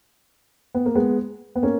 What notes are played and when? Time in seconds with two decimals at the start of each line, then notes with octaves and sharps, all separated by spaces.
0.75 B3
0.86 A#3
0.95 G#3 B3
1.56 B3
1.63 A#3 C#4